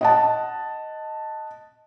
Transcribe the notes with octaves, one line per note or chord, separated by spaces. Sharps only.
D#5 F#5 A5